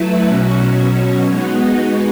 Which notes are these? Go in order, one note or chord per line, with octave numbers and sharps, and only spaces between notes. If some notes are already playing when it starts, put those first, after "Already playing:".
Already playing: F#3 A3 E4 B4 E5
B2 F#3 C#4 F#4
G#3 B3 D#4 F#4